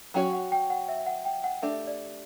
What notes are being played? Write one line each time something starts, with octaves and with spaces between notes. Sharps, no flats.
F#3 C#4 F#4 C#5 G5
F#5
G5
F#5
E5
F#5
G5
F#5
A3 D4 G4 E5
D5